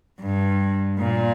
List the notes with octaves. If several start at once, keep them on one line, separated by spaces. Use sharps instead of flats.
G2
A#2